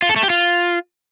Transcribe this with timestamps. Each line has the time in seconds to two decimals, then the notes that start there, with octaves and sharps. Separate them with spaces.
0.02 F4
0.09 A4
0.16 A3
0.23 G4
0.30 F4